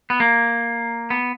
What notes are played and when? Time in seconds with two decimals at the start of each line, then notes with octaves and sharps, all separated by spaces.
0.10 B3
0.20 A#3
1.10 B3